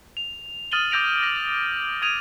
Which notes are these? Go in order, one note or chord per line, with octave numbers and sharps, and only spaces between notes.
F7
D#6 F6 A6 D#7 F#7 G7
D6 E6 G6 A#6 D7 F7
A#6 F#7
D#6 G#6 D7 D#7 F7